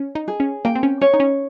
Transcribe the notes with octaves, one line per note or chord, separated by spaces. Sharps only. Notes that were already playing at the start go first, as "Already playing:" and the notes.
Already playing: C#4
D#4
G#4
C#4
A#3 G5
C4
C#4
C#4 C#5
D#4
C#4